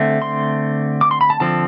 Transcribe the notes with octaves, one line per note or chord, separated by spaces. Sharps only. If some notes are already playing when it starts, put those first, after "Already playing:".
Already playing: D3 A3 C4
C6
D6
C6
B5
A5
D3 F3 C4 A5